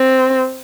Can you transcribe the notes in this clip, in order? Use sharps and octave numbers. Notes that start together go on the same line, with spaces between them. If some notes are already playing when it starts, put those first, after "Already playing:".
Already playing: C4